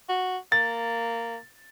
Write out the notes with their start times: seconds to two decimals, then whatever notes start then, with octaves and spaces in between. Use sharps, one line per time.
0.09 F#4
0.52 A#3 A6